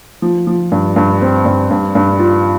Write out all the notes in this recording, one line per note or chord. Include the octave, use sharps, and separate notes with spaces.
F3
F3
G2
G2
C4
G2
G2
G2
F4